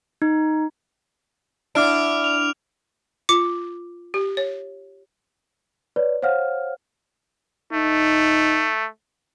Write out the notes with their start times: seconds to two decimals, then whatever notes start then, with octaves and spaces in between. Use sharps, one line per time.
0.22 D#4
1.75 D4 E4 F#5 D6 F6 D7
2.24 F7
3.29 F4 D6
4.14 G4
4.37 C#5
5.96 B4 C#5 D5
6.22 C5 C#5 F5 F#5 F6
7.73 A3 D#4